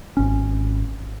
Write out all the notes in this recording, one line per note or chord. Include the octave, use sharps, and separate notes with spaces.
G#1 C#4